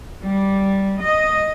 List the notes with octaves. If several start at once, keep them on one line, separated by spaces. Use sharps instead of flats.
G3
D#5